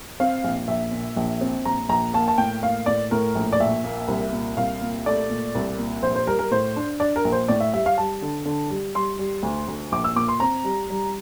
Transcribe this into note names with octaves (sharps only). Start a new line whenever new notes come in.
C4 F5
A#1
A#1 E5
A#2
A#1
C4
A#1 A#5
A#1 A#5
A#3 A5
A5
A2 G5
A#3 F5
A2 D5
A2 A#4
A#1
D5
A#1 E5
A#3
C2
A#2
C2 F5
A#2
A3 D5
A#2
C2
A#2
A#1 C5
C5
G3 A#4
A#4
A2 C5
D4
D4 D5
A#4
A#1
C5
A2 D5
E5
G3 E5
F5
G3 A5
D3
D3
G3
G3 C6
G3
D2
D2
A#1 D6
E6
A#2 D6
C6
C4 A#5
G3
G3